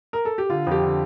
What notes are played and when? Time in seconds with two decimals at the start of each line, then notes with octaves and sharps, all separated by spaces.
0.13 A#4
0.25 A4
0.38 G4
0.49 D3 F4
0.67 F2 G4
0.83 D3